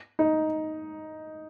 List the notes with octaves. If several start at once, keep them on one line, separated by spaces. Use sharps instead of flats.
D#4